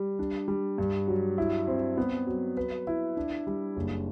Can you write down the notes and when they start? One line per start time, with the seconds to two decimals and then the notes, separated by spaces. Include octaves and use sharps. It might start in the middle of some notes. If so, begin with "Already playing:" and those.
Already playing: G3
0.19 D4
0.48 G3
0.78 G2
1.08 F#3
1.38 E4
1.67 C4
1.97 B3
2.27 F#3
2.57 B4
2.87 E4
3.17 D4
3.47 G3
3.77 F#1